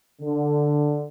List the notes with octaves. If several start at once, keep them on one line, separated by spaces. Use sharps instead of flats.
D3